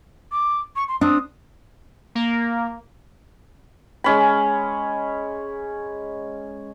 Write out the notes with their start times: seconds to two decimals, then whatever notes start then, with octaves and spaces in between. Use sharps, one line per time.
0.32 D6
0.76 C#6
0.88 C6
1.01 C4 D4 D#6
2.15 A#3
4.04 G#3 C#4 B5